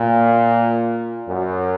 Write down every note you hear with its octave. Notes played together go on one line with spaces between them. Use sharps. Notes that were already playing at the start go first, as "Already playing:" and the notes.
Already playing: A#2
F#2